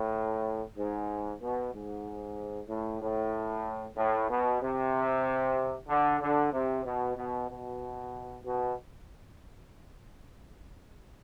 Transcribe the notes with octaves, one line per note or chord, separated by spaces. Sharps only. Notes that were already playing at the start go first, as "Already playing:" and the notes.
Already playing: A2
G#2
B2
G#2
A2
A2
A2
B2
C3
D3
D3
C3
B2
B2
B2
B2